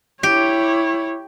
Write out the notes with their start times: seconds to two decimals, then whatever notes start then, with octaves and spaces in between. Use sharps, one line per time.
0.23 E4 G4 C#5